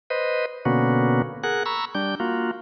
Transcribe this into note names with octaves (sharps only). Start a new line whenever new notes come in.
B4 C5 D#5
B2 D3 A#3 B3 C#4 F#4
G#4 A#4 F#5 F#6
A#5 B5 C#6 E6
G3 D4 G6
A#3 F4 F#4